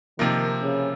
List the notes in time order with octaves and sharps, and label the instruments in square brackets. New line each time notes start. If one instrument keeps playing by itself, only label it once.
[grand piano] C3 F3 A#3 [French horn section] D#3
[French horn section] C#3